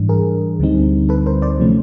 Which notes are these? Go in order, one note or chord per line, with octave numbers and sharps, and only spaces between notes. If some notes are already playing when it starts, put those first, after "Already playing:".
Already playing: G#2 E3 G3 D4
G#4 A#4
D2 D3 G3 C4 D#4
A4 B4
A#4 C5
C5 D5
C3 F3 A3 C#4